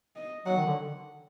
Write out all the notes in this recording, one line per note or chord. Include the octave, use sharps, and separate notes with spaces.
D#5
F#3 F#5
D#3
D3